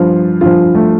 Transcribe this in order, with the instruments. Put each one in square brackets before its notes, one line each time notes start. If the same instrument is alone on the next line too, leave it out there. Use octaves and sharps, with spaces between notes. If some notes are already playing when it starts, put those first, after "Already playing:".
Already playing: [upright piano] G2 F3 F4
G2 F3 F4
A3